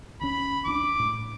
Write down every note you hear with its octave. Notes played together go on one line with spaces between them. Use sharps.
D2 C#4 B5
D2 C#4 D4 D6
A2